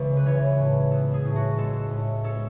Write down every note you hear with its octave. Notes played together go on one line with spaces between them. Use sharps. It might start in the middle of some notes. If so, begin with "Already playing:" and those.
Already playing: C#2 C#3 E3
B4
E3 C#5
A2
B3 A4
G#4
A2
F#4
G#3 A4
A2
C#4 A4